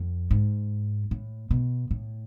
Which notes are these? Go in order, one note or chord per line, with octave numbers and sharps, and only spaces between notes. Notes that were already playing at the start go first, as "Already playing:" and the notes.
Already playing: F2
G#2
A2
B2
A2